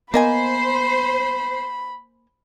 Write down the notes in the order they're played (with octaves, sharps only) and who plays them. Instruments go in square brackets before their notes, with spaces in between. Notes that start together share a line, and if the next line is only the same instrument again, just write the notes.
[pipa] A#3 D#5 G#5 [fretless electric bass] B3 [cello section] C5 [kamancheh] B5